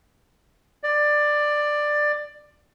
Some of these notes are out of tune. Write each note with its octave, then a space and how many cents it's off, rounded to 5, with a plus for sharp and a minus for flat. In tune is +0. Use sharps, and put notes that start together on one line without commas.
D5 +15